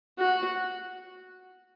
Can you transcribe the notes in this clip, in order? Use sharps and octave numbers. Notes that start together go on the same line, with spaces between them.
F#4